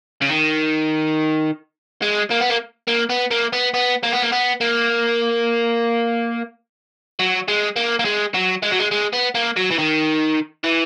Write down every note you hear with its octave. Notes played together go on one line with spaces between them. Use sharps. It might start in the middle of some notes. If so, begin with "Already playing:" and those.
C#3
D#3
G#3
A#3
B3
A#3
A#3
B3
A#3
B3
B3
A#3
B3
A#3
B3
A#3
F#3
G#3
A#3
A#3
G#3
F#3
G#3
F#3
G#3
G#3
B3
A#3
F#3
E3
D#3
E3